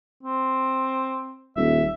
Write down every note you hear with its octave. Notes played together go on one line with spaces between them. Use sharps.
C4
D#1 E5